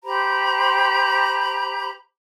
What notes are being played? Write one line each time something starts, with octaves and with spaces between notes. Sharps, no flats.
G4 C5 A#5 B5